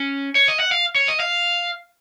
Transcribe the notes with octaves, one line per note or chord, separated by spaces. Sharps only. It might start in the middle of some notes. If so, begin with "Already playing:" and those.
Already playing: C#4
C#5
D#5
F#5
F5
C#5
D#5
F5